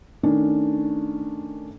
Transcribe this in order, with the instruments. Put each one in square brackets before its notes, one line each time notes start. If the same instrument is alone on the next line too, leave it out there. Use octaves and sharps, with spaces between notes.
[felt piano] D#3 A3 C#4 D4